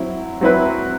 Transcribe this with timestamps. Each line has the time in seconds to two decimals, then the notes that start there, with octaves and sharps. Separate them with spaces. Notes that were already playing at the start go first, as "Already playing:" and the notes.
Already playing: F#3 C4 E4
0.41 F#3 C4 E4 B4